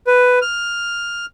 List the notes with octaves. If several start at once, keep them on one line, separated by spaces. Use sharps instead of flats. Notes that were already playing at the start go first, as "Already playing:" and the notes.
B4
F6